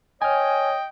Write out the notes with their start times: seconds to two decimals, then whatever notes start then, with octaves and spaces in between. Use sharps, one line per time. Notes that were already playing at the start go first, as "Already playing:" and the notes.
0.22 C#5 D#5 G5 G#5 F6